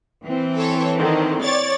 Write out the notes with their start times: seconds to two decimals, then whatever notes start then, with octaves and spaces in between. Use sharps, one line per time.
0.24 E3 C4
0.55 A4 C#5
0.97 D3 D#3
1.42 C#5 D5 A6